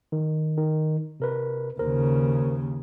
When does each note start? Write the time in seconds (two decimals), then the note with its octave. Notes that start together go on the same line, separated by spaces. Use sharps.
0.12 D#3
0.57 D#3
1.20 C3 A#4 B4
1.79 D#2 C#3 A#4 C5